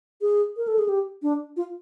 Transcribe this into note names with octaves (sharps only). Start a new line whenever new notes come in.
G#4
A#4
A4
G#4
G4
D4
F4